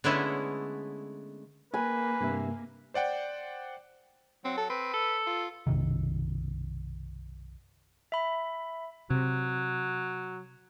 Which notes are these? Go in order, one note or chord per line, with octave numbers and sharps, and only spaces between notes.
D3 G#3 A3 B3 C#4 E4
A#3 B4 G#5
G2 C3 E5
C5 D5 F#5 G5
F#3 C4
A4
C4 B4
A4
F4
B1 F#2 C3 D#3
E5 B5
C3 F#3